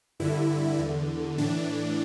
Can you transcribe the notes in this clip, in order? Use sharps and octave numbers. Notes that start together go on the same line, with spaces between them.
G2 D3 E4
E2 D3
A2 E3 D4